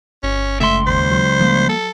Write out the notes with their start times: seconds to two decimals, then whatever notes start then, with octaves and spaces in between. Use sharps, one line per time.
0.23 G1 C#4
0.60 F#1 C#2 A3 E5 C6
0.87 D#2 C5
1.11 F#3
1.40 F3 G3 A#3
1.69 A4